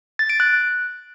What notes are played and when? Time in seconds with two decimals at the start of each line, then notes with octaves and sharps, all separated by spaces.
0.19 A6
0.30 D7
0.40 F#6